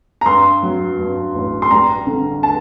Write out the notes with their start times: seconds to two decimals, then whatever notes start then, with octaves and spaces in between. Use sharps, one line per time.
0.21 A#5
0.26 G2 C6
0.63 F#3
0.99 G2
1.35 A1
1.62 C6
1.71 G3 A#5
2.07 D3
2.43 A5